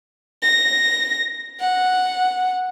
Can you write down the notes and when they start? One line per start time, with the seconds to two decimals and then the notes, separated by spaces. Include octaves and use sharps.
0.43 A#6
1.60 F#5